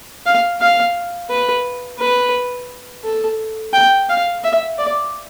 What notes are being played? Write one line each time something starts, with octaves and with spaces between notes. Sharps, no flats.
F5
F5
B4
B4
A4
G5
F5
E5
D5